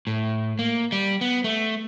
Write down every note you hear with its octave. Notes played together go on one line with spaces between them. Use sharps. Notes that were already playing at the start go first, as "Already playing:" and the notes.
A2
A#3
G3
B3
A3